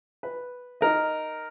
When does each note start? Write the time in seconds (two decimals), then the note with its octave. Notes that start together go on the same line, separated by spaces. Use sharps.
0.23 B4
0.81 D#4 A#4 D#5